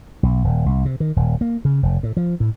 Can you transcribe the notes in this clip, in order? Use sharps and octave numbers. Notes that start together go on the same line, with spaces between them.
B1
D#1
C2
C3
D#3
D#1
A#3
C#3
F1
A2
F3
A2